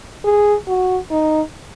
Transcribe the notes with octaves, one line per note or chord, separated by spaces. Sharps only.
G#4
F#4
D#4